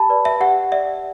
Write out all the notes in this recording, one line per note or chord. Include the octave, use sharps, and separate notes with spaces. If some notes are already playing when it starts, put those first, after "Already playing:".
Already playing: G4 A5 B5
B4 D5
E5
G4 F#5
D5 E5